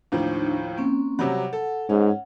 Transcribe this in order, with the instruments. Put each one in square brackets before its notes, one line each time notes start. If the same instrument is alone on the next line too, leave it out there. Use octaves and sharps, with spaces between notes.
[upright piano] D#2 A2 F3 [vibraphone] D4 D#4
[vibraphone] A#3 C4 C#4
[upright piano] C3 F#3 G3 [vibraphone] F#5
[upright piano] A4
[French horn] G#2 [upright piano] C#4